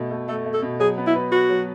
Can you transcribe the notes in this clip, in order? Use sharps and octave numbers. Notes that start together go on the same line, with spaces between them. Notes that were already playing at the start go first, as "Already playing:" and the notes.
Already playing: B2 A3
A3
A3 A4
A3
A4
B2
F#3 G#4
B3
E4
B4
F#4 B4
F#3